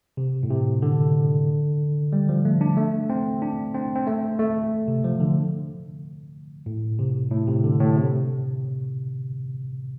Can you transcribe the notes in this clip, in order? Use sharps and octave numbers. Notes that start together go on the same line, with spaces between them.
C3
A2
C3
D3
G3
F3
A3
D4
A3
C4
D4
C4
C4
A3
A3
C3
F3
D3
A2
C3
A2
C3
D3
A2
C3